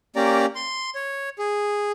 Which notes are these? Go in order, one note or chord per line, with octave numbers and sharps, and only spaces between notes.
A#3 C#4 G4 D5 A#5
C6
C#5
G#4